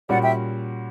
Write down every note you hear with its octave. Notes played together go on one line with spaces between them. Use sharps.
A#2 G3 C#4 F#4 D5 F#5
E5 G5